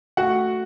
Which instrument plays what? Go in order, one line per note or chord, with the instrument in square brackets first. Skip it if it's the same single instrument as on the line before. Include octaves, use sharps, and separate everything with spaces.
[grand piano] A3 F#4 F#5